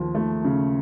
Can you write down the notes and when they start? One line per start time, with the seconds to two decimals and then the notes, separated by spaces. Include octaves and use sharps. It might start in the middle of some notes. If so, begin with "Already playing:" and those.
Already playing: D#2 F3
0.15 A3
0.45 C#3